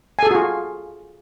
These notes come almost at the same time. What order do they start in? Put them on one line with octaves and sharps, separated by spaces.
G#5 A4 G#4 F#4 F4